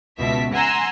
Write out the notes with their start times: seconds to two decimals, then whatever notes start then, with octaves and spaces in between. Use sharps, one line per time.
0.19 C#2 B2 E5 A5 B6
0.52 F#5 G#5 A#5 C6 E6